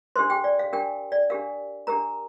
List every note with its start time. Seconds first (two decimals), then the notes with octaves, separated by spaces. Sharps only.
0.16 D4 G4 A#4 C5 C6
0.30 G4 G5
0.44 D5
0.59 F5
0.73 D4 G4 A#4 G5
1.12 D5
1.30 D4 G4 A#4 F5
1.87 D4 G4 A#4 A#5